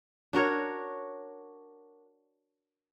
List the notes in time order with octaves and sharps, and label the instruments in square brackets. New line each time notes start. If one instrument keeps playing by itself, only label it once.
[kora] D4 F#4 A#4 C#5